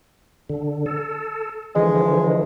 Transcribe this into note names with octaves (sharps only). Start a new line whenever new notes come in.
D3
A4
D3 E3 F3 G#3